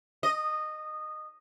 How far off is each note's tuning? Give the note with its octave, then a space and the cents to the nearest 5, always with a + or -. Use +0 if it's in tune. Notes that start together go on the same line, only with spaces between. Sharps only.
D#5 -15